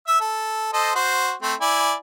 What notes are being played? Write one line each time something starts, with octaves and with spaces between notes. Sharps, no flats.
E5 E6
A4
A4 C5 D#5
F#4 C5
A3 C4
E4 D5 G#5